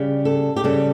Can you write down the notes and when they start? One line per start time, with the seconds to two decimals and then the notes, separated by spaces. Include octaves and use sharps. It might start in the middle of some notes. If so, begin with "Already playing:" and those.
Already playing: C#3 G3
0.25 A4
0.56 G4
0.64 C#3 G3 A4